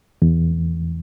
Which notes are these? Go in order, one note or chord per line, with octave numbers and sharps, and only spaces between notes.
E2